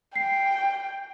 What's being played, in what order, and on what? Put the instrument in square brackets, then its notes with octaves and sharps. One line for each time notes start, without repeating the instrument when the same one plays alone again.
[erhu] G5 [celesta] C7